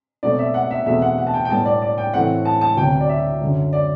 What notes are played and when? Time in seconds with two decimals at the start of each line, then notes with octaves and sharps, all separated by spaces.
0.23 B2 F#3 A3 C4 D5
0.39 E5
0.54 F#5
0.71 E5
0.86 E2 B2 A3 C4 E5
1.02 F#5
1.18 F#5
1.27 A5
1.34 G5
1.45 G5
1.50 A2 G3 B3 A5
1.65 D5
1.82 D5
1.98 G5
2.14 A2 E3 A3 C4 F#5
2.45 A5
2.61 A5
2.77 D2 C3 F#3 B3 G5
3.01 D5
3.09 E5
3.41 F#2 D3 F#3
3.73 D5